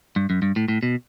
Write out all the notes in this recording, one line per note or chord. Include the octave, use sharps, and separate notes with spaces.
G2
F#2
G2
A2
A2
B2